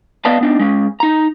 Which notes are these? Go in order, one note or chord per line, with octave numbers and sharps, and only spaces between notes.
B3 B4 D5 D#5 F5 A5
B3 D4 D#4
G#3 C#4
D#4 A#5